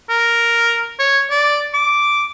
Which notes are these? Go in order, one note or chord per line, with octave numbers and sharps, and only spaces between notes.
A#4
C#5
D5
D6